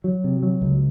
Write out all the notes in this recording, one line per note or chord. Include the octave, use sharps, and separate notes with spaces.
F#3
C3
F#3
C#2